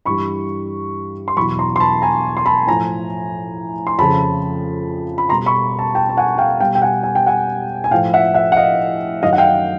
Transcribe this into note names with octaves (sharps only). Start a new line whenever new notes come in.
G2 E3 G3 B5 C#6
C6
E2 B2 F#3 B5 C#6
A#5 C6
C6
A5 B5
G#5 A#5
C6
A5 B5
A2 F3 G#5 A#5
C6
F2 C#3 F3 A5 B5
B5
B2 G3 A#5 C6
B5 C#6
A5 B5
G5 A5
A5
F#5 G#5
F5 G5
B2 G3 F5 G5
G5
F#5 G#5
G#5
G5
F#5 G#5
G#5
A2 F3 F5 G5
E5 F#5
E5 F#5
F#5
D#5 F5
F#2 D#3 F#3 D#5 F5
F#5
F5 G5